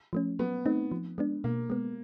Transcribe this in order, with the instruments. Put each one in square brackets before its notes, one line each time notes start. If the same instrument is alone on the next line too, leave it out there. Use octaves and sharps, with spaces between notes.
[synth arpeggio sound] F3 A3 C#4
[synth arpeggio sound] F#3 [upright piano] B3
[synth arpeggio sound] A3 C4 D#4
F3
G#3 B3 D4
[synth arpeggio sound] B2 [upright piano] A#3
[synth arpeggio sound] G#3 B3